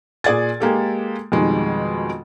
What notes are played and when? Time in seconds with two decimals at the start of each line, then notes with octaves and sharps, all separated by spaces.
0.24 A#2 G#4 D5 G#6 A6
0.60 G#3 A#3 G4 A4
1.32 F2 B2 D#3 G3 G#3